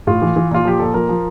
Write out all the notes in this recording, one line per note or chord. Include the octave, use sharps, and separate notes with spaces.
A2 F4
E3
E3
A#2 F4
F3 G4
A#2 A4
F3 A#4
F3